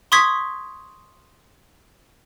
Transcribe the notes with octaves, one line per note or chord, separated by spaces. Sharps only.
C6 C#6 D#6 G#6 B6